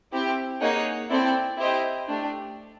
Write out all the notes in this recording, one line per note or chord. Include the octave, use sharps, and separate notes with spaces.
C4 E4 G4
A#3 D#4 G#4 C#5 F#5
C4 E4 A4 D5 G5
E4 G4 C5 D#5 G5
A3 D4 G4